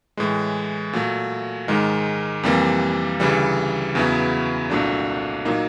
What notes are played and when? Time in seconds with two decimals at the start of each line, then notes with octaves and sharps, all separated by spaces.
0.17 A2 E3 G#3
0.93 A#2 F#3 A3
1.68 G#2 D#3 G#3
2.43 F2 C3 E3 G3 A#3
3.20 D2 C#3 E3 G3
3.95 E2 C#3 F#3 B3 E4
4.70 C2 A#2 F#3 A3 D4
5.45 A#2 F#3 A#3 D#4